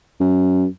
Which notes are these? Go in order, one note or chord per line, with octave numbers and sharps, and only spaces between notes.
F#2